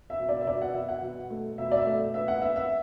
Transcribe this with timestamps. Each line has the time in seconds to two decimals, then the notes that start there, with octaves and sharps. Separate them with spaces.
0.10 E5
0.20 B2
0.29 D5
0.41 E5
0.47 B2 D5
0.62 F#5
0.75 B2 E5
0.88 F#5
1.03 B2
1.30 A3
1.58 B2 E5
1.72 D5
1.77 E5
1.86 A3
2.14 B3 E5
2.28 F#5
2.42 B3 E5
2.56 E5